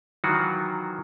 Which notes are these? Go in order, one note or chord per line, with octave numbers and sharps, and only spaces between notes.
D#3 E3 F#3 F4 F#4